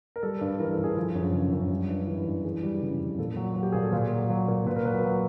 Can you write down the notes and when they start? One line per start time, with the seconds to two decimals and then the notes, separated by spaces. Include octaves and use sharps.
0.16 A#4
0.23 G3 A4
0.41 G2
0.59 E3 A#4
0.72 A4
0.79 G2
0.84 G#4
0.97 F3
1.15 F#2
1.34 C#3
1.52 F#2
1.70 G3
1.89 G2
2.07 E3
2.26 G2
2.45 E3 G#4
2.63 G3
2.82 C#3
3.00 F2
3.19 A#2 A4
3.37 F#3
3.53 F#3 F#4
3.63 G4
3.72 A#2 G#4
3.83 A4
3.93 A#2 A#4
4.11 F#3
4.30 F#3
4.48 A#2
4.67 A#2 B4
4.76 A#4
4.85 F#3 B4
5.04 F#3